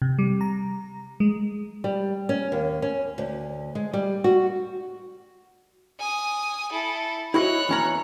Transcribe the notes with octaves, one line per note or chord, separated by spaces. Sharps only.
C3
G3
A#5
G#3
G3
C#4
D#2
C#4
D2
G#3
G3
F#4
G#5 D#6
E4 A4
E4 F#4 C#5 D#5 F#6
E2 C#4 A#5